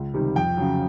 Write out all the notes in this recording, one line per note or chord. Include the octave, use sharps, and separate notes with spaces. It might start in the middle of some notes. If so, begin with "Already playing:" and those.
Already playing: C#2
C3 D#3 G3
F2 G5
C#3 F#3